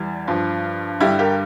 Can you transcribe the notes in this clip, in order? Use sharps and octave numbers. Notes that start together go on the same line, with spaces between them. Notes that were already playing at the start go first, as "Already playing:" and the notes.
Already playing: E2 E3 G3
G2 F3
G2 D3 G3 E4 G4
G4 A#4